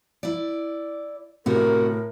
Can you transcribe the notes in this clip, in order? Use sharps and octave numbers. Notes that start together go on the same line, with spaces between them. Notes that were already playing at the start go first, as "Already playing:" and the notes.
E4 D5
A2 C3 B3 F#4 A#4